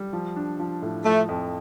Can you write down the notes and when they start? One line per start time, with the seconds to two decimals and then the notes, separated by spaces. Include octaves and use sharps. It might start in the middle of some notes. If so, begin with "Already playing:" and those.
Already playing: G3
0.13 F3
0.36 D4
0.59 F3
0.82 A2
1.05 F3 A3
1.29 F2